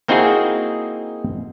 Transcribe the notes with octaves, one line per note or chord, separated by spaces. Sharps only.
A#3 C4 D#4 E4 F#4 G#4